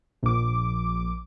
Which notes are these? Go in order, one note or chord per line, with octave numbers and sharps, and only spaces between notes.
A#1 D6